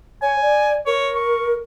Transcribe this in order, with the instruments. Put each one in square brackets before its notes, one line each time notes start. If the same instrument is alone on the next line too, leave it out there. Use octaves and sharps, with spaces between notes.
[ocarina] C#5 [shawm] G#5
[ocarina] D5
[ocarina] A#4 [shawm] C#5
[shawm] C#6